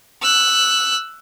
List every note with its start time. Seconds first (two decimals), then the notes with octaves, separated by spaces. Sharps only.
0.23 E6 F#6